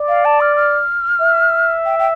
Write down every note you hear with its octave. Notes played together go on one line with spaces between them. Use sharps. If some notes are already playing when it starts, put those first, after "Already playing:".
Already playing: D5
F5
A5
F6
F6
E5
G5
G5